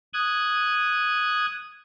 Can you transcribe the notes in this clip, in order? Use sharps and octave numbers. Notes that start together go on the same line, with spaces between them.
D#6 F#6 G#6